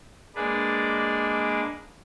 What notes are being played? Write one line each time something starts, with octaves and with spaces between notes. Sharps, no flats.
G#3 A#3 D4 B4 D5